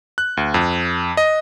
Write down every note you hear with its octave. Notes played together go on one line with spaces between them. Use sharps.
F#6
D2
F2
D#5